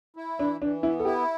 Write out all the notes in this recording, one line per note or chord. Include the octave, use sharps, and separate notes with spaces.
E4
E3 D4
E3 D4
B3 E4
A4
E4 G4